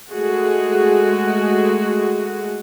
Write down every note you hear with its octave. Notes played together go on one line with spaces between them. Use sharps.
G#3 A3 F#4 G#4